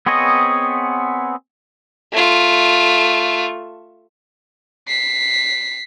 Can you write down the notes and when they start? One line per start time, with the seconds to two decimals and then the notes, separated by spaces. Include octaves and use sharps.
0.06 B3 C4 G#4 C#5 D#5
2.13 A3 F4
4.88 B6 C7